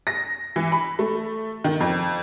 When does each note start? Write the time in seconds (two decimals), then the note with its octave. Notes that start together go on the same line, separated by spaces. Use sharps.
0.07 A#6
0.56 E3
0.72 B5
0.99 A3
1.64 D#3
1.80 F2